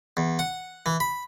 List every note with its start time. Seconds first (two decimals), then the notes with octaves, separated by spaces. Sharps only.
0.17 E2
0.39 F#5
0.86 E3
1.00 B5